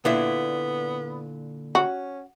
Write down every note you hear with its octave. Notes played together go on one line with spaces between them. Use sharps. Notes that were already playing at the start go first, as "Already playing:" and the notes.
A#2 D3 B3 E4
C#4 F#4